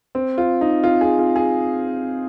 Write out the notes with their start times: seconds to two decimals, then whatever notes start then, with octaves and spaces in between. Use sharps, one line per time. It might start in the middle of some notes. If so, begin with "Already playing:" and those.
0.15 C4
0.38 F4
0.61 D#4
0.84 F4
1.01 G#4
1.19 F4
1.36 G#4